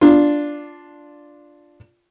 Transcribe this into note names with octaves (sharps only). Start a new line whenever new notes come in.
D4 F4